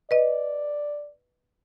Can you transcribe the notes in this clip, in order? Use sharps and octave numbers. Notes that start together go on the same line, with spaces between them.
B4 D5 D#5